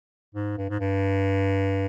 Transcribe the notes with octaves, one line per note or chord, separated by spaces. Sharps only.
G#2
G2
G#2
G2